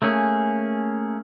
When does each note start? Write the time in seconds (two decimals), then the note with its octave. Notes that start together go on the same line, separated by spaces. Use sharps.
0.02 A3 A#3 C#4 G#4